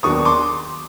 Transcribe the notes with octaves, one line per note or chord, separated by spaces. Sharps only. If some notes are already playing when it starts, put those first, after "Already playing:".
D#2 D#3 F#3 B3 D4 C#6 D#6
C6 D6